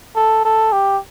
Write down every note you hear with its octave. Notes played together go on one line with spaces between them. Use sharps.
A4
A4
G4